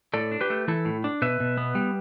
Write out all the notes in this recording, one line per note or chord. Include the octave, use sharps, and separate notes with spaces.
A2 A4 D5
D4
G4 B4
A3
E3 E4 A4
A2
D4
B2 B4 E5
B2
B3
G3